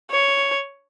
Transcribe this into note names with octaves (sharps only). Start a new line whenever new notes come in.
C#5